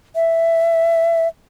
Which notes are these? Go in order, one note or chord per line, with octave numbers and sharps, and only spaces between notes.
E5